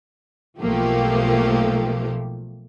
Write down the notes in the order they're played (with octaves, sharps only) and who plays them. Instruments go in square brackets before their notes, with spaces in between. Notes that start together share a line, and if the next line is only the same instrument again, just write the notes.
[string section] B1 F3 A3 A#3 G4